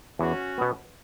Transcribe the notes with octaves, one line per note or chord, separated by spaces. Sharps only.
E2 C#4 F#4
B2 B3